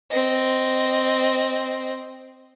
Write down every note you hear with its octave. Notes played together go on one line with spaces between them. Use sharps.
C4 D#5